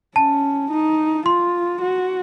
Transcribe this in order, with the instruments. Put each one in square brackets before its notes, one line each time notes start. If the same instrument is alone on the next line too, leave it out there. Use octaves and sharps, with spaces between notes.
[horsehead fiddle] C#4 [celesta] A5
[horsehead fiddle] D#4
[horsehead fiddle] F4 [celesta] C6
[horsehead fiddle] F#4